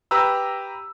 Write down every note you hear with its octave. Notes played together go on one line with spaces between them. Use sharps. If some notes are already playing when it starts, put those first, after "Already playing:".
G4 B4 A#5 E6